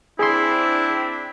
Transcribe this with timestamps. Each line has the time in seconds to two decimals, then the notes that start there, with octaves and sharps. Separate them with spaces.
0.19 C4 D4 E4 G#4 C6